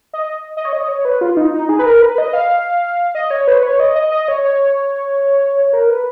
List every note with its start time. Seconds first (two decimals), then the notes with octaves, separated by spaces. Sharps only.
0.13 D#5
0.57 D#5
0.65 C#5
0.73 D#5
0.88 C#5
1.05 B4
1.21 F4
1.37 D#4
1.54 D#4
1.69 G#4
1.79 B4
1.86 A#4
2.01 B4
2.18 D#5
2.33 F5
3.15 D#5
3.31 C#5
3.48 B4
3.63 C#5
3.80 D#5
3.96 D#5
4.12 D#5
4.28 C#5
4.44 C#5
5.73 A#4
5.90 B4